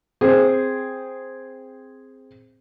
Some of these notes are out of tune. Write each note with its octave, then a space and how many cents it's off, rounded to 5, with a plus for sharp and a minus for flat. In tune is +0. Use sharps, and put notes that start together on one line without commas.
C4 +0 G#4 +0